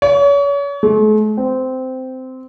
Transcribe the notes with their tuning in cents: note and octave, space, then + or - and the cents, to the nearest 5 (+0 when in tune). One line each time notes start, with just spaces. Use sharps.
C#5 +35
A3 -45
C4 -15